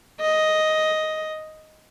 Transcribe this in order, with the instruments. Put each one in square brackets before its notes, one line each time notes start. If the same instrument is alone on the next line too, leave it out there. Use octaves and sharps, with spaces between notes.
[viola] D#5